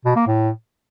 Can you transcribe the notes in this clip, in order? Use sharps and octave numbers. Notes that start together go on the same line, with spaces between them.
B2
A#3
A2